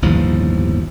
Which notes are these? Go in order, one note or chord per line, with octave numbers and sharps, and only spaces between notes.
G1 D#2 A2 F3